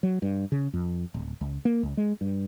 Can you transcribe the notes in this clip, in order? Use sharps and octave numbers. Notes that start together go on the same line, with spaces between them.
F#3
G2
C#3
F2
D1
C#2
A#3
C#2
G#3
G2